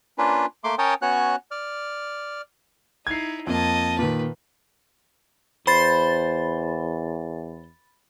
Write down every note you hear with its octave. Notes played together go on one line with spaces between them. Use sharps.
A#3 C#4 D4 F4 B4
A3 A#3 C6 D6
C#4 A#4 C#5 G5 A5 D#6
B3 C#4 F#4 C#5 F#6
D5 F6
D#4 E4 G#6 C7
F2 A#3 D#5 A5
A#2 D#3 B4
E2 C5 B5 A6